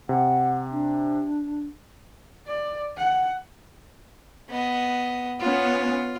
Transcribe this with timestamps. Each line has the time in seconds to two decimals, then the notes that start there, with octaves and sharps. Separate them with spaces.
0.09 C3 F#5
0.72 D4
2.47 D5
2.97 F#5
4.50 B3 D#5
5.40 B3 C#4 F4